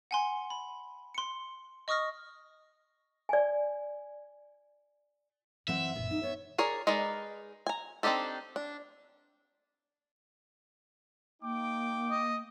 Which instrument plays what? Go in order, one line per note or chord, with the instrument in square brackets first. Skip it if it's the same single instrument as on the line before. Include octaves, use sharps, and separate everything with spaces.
[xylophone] F#5 G#5 C6
B5
C6 C#7
D#5 C#6 D#6 F6 A#6
[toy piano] D5 G#5
[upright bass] F#2 [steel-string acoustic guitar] E3 C4 F#5 [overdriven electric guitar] E5
[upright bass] F#1 A#2 [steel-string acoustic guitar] B3
[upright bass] D4 [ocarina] D#4
[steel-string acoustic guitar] B3 [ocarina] C#5
[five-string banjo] G#4 A#4 C#5 D5
G#3 D#4 A#4 B4 D5
G#5 A#5
C4 D4 D#4 G4 A4
D4
[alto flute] A#3 [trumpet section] D#4 G5 D6
[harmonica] D#5